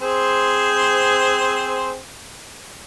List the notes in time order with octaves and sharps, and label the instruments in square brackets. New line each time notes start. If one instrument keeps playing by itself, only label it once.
[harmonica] C4 G#4 C5